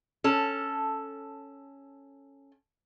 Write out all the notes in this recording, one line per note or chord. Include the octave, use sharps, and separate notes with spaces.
C#4 A4